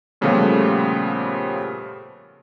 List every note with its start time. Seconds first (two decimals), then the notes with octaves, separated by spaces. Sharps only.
0.21 A#2 C#3 F3 G3 A3 B3